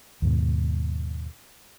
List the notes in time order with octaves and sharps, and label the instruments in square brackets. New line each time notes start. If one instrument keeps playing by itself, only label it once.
[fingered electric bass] D#2 G#2 B2